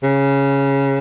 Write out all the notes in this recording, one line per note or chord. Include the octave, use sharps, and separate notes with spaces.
C#3